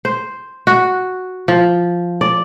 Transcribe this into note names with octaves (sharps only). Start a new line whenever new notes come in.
C5
F#4
F3
D5